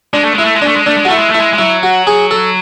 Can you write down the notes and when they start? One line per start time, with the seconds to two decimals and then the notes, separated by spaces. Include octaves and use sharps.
0.13 G#3 D4
0.24 A3
0.34 G#3 E4
0.45 A3
0.56 G#3
0.62 A3 D4
0.76 G#3
0.86 A3 D4
0.97 G#3
1.05 F#4
1.08 A3 E4
1.18 G#3
1.30 A3 E4
1.40 G#3
1.53 G#3
1.58 F#3 E4
1.83 F#4
2.07 G#4
2.31 A4